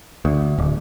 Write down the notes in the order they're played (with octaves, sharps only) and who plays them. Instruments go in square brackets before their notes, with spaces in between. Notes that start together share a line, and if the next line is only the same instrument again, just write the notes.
[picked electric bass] D2
D1